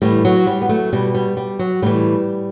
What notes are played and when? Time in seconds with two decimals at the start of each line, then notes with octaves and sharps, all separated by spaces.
0.02 A2 E3 G3
0.25 F#3
0.47 G3
0.62 B3
0.69 F#3 A3
0.93 B2 G3
1.15 G3
1.37 G3
1.59 F#3
1.82 A2 E3 G3